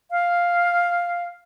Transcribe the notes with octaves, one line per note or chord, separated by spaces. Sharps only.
F5